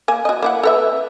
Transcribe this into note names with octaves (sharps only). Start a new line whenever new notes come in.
A#3 G#5
F#4 D#5
A#3 E4 F#5
A4 B4 E5